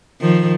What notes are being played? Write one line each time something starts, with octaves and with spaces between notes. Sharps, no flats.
D#3 F3